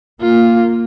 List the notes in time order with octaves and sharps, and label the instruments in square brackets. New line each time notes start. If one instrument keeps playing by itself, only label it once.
[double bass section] A#3 [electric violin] F4